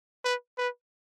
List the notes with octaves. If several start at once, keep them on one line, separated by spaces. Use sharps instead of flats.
B4
B4